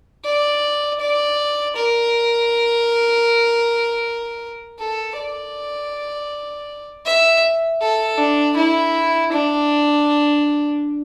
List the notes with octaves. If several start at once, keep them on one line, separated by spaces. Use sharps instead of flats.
D5
D5
A#4
A4
D5
E5
A4
D4
E4
D4